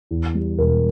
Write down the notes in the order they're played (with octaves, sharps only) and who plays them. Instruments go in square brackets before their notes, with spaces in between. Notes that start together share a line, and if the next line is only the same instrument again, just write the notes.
[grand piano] E2
G3
E1 A#4